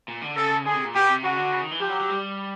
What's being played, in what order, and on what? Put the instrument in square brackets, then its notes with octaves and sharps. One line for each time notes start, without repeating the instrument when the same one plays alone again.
[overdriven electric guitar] A#2
D3
[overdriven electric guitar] C#3 [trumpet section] A4
[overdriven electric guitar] D3 [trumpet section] G#4
[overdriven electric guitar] C3
A#2
[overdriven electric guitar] B2 [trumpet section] G4
[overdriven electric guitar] C3
[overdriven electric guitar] C#3 [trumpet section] F#4
[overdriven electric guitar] D3
C#3
D#3
E3
[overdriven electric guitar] F3 [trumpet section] G4
[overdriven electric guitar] F#3
F#3
G3